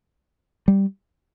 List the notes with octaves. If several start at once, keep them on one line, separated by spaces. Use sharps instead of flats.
G3